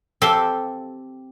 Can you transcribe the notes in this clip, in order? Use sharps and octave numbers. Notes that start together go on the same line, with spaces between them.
C4 G4 A4 C5 F5